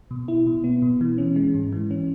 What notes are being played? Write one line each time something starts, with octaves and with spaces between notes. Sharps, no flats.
B2
E4
B2
B3
B2
E3
C#4
G#3
G#2
E3
C#4